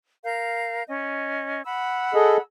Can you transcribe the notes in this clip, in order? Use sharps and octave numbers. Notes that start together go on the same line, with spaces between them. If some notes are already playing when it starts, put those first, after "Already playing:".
A#4 F5 G6
C#4 D#5
F#5 B5 E6
G#4 A4 D#5